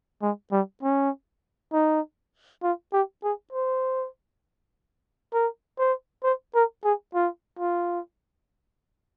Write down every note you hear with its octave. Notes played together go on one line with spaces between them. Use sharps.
G#3
G3
C#4
D#4
F4
G4
G#4
C5
A#4
C5
C5
A#4
G#4
F4
F4